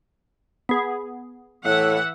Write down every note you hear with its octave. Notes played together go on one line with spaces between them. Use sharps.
B3 G#4
A2 E3 E5 F#5